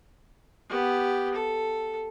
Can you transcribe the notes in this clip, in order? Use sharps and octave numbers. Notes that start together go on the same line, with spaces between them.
B3 G4
A4